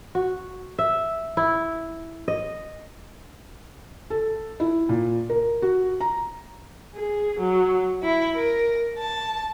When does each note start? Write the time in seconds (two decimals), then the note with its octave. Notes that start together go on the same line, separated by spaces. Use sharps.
0.15 F#4
0.78 E5
1.37 E4
2.28 D#5
4.10 A4
4.60 E4
4.89 A#2
5.30 A#4
5.62 F#4
6.01 A#5
6.96 G#4
7.40 F#3
8.02 E4
8.34 A#4
8.99 A5